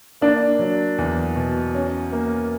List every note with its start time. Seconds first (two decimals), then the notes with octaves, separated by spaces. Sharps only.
0.21 A#3 D4
0.59 F#3
0.98 E2
1.36 B2
1.75 C#4
2.12 A#3